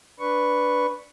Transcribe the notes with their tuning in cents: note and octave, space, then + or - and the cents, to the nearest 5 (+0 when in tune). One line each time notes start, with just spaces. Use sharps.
D4 +0 B4 +0 C#6 +0